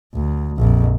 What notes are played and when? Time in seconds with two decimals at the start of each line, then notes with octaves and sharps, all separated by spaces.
0.14 D2
0.58 A#1 F2